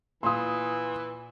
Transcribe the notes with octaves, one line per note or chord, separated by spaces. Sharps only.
A#2 E3 F4 C6 D#6